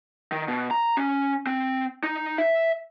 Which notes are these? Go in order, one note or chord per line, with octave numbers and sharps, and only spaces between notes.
D#3
B2
A#5
C#4
C4
D#4
E5